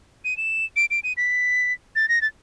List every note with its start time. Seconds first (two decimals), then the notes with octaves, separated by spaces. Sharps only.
0.25 D#7
0.37 E7
0.76 D7
0.91 D7
1.04 D#7
1.17 B6
1.96 A6
2.09 A#6
2.22 A6